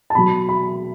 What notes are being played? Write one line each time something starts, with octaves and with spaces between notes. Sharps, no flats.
A5
B2 F#3 B5
B5